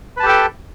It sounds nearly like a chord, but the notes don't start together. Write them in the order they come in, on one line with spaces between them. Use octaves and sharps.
B4 A5 G4 A4 G5